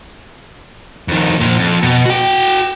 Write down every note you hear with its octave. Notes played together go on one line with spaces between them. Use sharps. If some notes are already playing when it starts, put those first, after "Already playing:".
F2 D#3
A#2 F3
F2
B2
F#4 G5